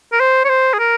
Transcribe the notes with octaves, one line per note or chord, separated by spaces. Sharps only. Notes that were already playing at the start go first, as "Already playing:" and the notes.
A#4
C5
C#5
C5
G#4
A#4